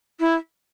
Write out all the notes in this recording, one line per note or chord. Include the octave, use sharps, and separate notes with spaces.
E4